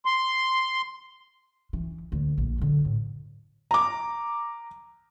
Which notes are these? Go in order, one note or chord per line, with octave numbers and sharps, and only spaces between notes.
C6
E3
D2
A#1
D3 F#3
A2
A#5 D6